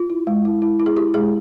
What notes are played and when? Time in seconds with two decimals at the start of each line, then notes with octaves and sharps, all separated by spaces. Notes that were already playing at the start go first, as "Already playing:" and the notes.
Already playing: F4
0.10 E4
0.27 G#3
0.45 E4
0.62 E4
0.80 E4
0.86 G#4
0.96 E4 G4
1.14 G#3 G#4